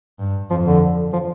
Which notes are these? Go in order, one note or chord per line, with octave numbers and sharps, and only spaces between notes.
G2
F2 F3
D3
F3